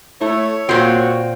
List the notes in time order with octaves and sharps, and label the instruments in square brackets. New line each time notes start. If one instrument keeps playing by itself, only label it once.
[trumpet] A3 [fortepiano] E4 [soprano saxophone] C#5
[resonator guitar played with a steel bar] A#2 C4 [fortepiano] A#3 F4 [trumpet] F#4